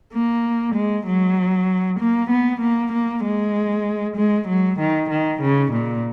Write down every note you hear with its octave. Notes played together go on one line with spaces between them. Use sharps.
A#3
G#3
F#3
A#3
B3
A#3
A#3
G#3
G#3
F#3
D#3
D#3
C#3
A#2